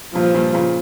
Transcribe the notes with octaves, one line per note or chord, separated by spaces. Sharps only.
G2 A#2 F3
G2 A#2
A#2 C#3